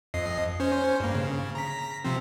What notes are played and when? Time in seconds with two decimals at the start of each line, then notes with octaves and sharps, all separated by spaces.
0.14 F2 D#5 C7
0.60 C#4 C5
1.00 G2 A#3
1.15 C#3
1.55 A#5 B6
2.04 C3 F3 C4